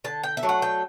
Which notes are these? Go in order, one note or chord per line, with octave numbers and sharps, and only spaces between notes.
D3 A5
G5
E5
F#3 A3 D4
F#5
G5